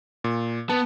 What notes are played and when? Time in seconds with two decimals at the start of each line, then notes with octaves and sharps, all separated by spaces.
0.24 A#2
0.69 B3 A5